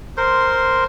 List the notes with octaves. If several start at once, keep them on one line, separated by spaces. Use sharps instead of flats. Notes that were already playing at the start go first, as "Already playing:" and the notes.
A#4 C5 C6